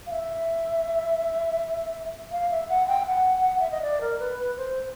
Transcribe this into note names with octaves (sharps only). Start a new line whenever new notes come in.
F5
E5
F5
E5
F#5
G5
F#5
E5
D#5
D5
A#4
B4
B4
C5